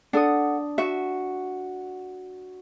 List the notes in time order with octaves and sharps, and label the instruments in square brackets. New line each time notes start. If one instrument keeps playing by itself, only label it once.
[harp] D4 D#6 [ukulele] A4 F#5
[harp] F#4 [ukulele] E5